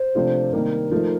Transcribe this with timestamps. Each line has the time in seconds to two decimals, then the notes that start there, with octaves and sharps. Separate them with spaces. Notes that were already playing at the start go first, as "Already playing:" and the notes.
Already playing: C5
0.15 C3 F3 A3 D4 F4
0.53 C3 D#3 G3 A#3 D#4 A#4
0.91 F3 A3 D#4